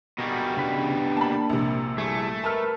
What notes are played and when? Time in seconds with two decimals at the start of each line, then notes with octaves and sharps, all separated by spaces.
0.19 B2 G3 F#4 G#4 A#4
0.57 C#3 D4 B5 F#6
1.17 A#3 A5 B5
1.49 A#1 C3
1.98 G3 A3 E4 G#4
2.44 A#4 B4 A5 E6 F6